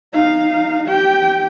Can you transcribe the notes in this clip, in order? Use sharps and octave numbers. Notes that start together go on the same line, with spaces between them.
D#4 F5
G4 G5